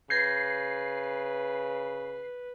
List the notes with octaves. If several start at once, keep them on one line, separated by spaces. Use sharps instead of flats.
C#3 B4 G6 G#6 A#6 C7